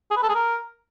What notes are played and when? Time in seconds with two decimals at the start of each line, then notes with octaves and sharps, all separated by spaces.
0.11 G#4
0.17 B4
0.23 A4
0.29 G#4
0.35 A#4